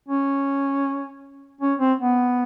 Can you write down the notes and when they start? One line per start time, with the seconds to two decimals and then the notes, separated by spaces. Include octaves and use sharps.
0.08 C#4
1.61 C#4
1.80 C4
2.00 B3